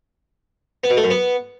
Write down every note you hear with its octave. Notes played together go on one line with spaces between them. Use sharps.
B3
B2
A3
F#2
B3